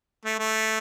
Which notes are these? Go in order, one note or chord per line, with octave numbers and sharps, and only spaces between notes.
A3
A3